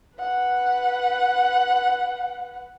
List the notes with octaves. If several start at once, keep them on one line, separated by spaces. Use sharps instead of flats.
B4 F#5